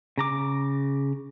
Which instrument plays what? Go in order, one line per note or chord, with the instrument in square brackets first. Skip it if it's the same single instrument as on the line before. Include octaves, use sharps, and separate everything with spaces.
[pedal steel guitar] C#3 A#5 D6